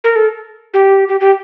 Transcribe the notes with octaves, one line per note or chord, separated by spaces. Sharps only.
A#4
A4
G4
G4
G4